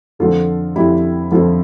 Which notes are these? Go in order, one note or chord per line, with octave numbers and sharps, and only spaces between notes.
F2 D3 F3 F4 A4
F2 D3 F3 E4 G4
F2 D3 F3 F4 A4